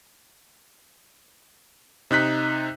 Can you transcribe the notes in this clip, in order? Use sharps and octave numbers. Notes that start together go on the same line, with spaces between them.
C3 D#4 F#6 B6